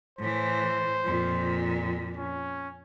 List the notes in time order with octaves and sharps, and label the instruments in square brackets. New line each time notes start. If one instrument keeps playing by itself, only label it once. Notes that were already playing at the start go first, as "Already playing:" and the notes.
[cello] A2 E3 [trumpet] C5
[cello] F2 A#2
[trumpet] C#4